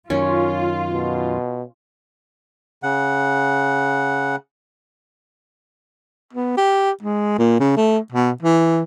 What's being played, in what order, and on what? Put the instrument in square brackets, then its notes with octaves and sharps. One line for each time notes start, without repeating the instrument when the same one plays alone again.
[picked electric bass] F#2 D#3 [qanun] C#4 [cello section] F4
[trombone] B2
[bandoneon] C#3 F#5
[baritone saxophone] B3
G4
G#3
A#2
C#3
A3
B2
E3